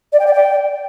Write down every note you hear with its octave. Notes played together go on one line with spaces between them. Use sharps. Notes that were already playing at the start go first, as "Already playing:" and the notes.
D5
G5
D5
G5